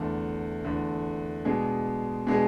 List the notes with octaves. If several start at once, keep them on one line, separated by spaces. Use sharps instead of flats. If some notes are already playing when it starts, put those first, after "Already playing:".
Already playing: E2 D3 A3
E2 D3 A3
B2 G#3 D4 G#4
B2 G#3 D4 G#4